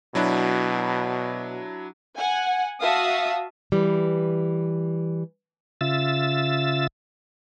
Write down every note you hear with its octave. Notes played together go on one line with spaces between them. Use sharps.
B2 F#3 D4 E4
F#5 G#5
F#4 E5 F5 A5 D#6
E3 G3
C#3 F4 E5 E6 A6